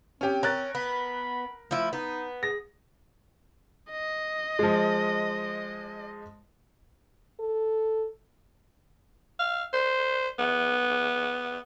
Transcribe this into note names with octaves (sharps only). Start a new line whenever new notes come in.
C4 C#4 G4
C#4 A#4 F#6 A6
B3 B5
F3 A3 E4
B3 D#4
G#4 A#6
D#5
F3 G#3
A4
F5
C5
B3